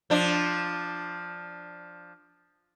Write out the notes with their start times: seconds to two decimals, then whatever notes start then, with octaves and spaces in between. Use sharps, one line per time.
0.10 F3 D4